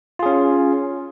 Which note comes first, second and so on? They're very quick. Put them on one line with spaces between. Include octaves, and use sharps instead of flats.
F4 G#4 C#4